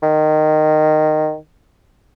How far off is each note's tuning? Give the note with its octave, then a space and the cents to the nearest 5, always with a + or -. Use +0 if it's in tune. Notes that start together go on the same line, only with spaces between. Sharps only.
D#3 -15